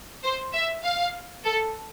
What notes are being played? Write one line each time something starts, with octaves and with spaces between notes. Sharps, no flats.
C5
E5
F5
A4